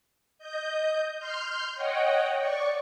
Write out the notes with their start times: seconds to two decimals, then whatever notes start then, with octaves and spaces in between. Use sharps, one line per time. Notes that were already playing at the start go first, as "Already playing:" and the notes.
0.39 D#5 G6
1.19 C6 F6 G6
1.75 C#5 D#5 F#5 G5
2.35 D5 C#6